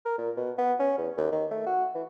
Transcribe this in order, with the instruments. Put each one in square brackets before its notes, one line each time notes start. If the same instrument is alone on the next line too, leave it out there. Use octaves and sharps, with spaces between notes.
[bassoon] A#4
A#2
B2
B3
C#4
E2
D#2
D#3
A3
F#4
E3